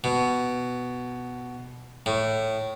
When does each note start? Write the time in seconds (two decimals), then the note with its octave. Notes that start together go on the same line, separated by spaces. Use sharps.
0.04 B2
2.06 A2